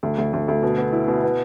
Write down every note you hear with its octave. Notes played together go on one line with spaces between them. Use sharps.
D2
D2
D2
D2
B2
B3
E4
B2
B3